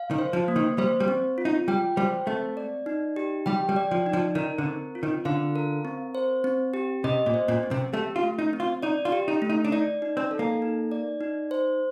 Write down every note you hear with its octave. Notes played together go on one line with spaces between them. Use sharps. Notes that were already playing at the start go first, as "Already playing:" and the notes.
Already playing: F5
D#3
C5
F3
A#3
D#3
G3 C5
G3
C4
F4
D#4
G3 G5
G3 C5
A3 C4
D5
D#4
G4
G3 G5
G3
D5
F3
D#4
F3
D#3 A#4
D3
C4
F4
D#3
D3 F5
A#4
C4
C5
C4
G4
C3 D#5
A#2
C5
A#2
C4
C3
A3 G4
F4
A3
D#4
C4
F4
D#4 D5
F4
G4
D#4
A3
D#4
D4
D#4 D5
D#4
C4
A4
A#3
D#4
D5
D#4
C5